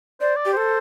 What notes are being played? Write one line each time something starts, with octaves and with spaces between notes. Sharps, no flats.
C5 D5
D5
G4
A4 C5